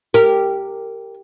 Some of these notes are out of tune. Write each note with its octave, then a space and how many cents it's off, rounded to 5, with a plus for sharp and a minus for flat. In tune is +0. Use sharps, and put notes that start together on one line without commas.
G4 +0 A#4 -20